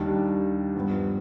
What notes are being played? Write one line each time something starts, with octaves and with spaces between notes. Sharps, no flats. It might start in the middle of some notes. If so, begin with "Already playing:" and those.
Already playing: D#2 D#3 G3 D4
G2 F3 B3